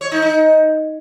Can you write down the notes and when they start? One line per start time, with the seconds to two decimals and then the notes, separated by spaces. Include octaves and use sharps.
0.01 C#5
0.12 D#4
0.22 D#4